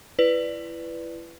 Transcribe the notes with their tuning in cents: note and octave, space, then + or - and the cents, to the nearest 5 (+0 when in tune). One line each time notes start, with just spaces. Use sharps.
E4 +30 B4 +5 D5 +0